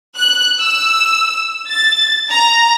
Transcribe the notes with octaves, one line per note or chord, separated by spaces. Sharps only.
F#6
E6
A6
A#5